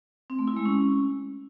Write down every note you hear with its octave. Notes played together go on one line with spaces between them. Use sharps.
C4
A3
E4
G#3
C#4